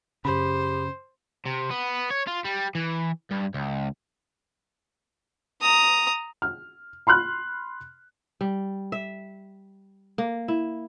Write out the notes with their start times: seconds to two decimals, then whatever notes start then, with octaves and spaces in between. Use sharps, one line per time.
0.25 F#2 C#3 G4 C5 B5
1.45 C3
1.70 B3
2.10 C#5
2.27 F4
2.45 G3
2.75 E3
3.31 G2
3.54 C#2
5.61 A#5 D#6
6.42 F6
7.07 B5 C6 F6 F#6
8.41 G3
8.92 E5
10.18 A#3
10.48 E4